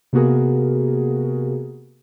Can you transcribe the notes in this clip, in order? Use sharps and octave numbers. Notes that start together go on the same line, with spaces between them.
C3 A#3 B3 F#4 G#4 A#4